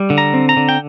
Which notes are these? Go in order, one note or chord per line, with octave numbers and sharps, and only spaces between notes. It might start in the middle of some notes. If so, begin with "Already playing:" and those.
Already playing: G3
D3
A#5
C4
A#5
D3
G5